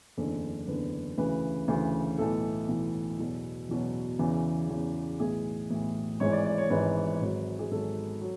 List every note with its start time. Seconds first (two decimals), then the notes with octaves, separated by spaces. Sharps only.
0.17 F#1 E2 D3 A4
0.67 F#1 E2 D3 B4
1.18 D2 C#3 E3 B4
1.68 D2 C#3 E3
2.18 B1 A2 E3 A4
2.69 B1 A2 E3
3.19 E2 B2 F#3
3.69 E2 B2 F#3
4.19 E2 C#3 E3
4.69 E2 C#3 E3
5.20 B1 A2 E3 G#4
5.70 B1 A2 E3
6.20 G#1 G#2 E3 C#5
6.33 D5
6.45 D5
6.58 C#5
6.70 G#1 G#2 E3 B4
7.21 G#1 G#2 F#3
7.59 G#4
7.71 G#1 G#2 F#3 A4
8.21 F#3